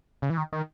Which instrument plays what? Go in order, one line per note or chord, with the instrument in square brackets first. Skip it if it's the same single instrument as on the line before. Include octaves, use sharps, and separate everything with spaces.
[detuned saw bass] C#3
E3
D#3
D#3